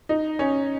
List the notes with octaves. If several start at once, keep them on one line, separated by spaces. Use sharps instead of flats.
D#4
C#4